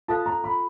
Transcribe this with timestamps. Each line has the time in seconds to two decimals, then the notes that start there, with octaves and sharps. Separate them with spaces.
0.08 F4 A4 C5 F5 A5
0.26 A#5
0.44 B5